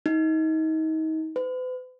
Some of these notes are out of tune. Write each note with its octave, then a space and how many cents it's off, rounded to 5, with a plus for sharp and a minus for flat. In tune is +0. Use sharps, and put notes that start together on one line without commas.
D#4 +30
B4 +45